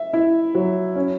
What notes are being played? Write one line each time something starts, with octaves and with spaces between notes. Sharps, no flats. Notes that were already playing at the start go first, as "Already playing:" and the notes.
Already playing: E5
E4
F#3
C#4